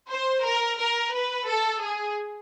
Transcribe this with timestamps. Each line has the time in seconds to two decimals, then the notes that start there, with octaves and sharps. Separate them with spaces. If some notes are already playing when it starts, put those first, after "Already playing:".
0.10 C5
0.43 A#4
0.79 A#4
1.13 B4
1.48 A4
1.82 G#4